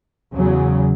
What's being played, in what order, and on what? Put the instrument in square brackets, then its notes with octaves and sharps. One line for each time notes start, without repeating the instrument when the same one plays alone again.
[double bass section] E2 C#3 F#3